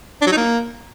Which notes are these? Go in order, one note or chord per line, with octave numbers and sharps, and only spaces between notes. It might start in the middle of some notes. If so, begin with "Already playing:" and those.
D4
F#3
D#4
A#3